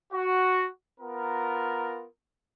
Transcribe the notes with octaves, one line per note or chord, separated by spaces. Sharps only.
F#4
B3 F4 A#4